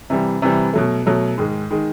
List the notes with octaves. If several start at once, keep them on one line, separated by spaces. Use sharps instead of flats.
C3 E3 G3
C3 E3 G3
B2 F#3 A3
B2 F#3 A3
G#2 D#3 G#3
D#3 G#3